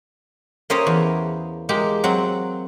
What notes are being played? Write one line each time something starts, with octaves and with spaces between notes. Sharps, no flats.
A#3 C#4 G4 C5 C#5 D#5
E2
G#3 A#3 G4
F#3 C4 F#5